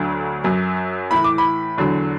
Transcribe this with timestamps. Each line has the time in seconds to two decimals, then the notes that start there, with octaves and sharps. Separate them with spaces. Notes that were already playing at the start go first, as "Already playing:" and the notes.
Already playing: D2 D3 F#3
0.44 F#2 F#3
1.11 A2 E3 B5
1.24 D6
1.38 B5
1.78 E2 D3 F#3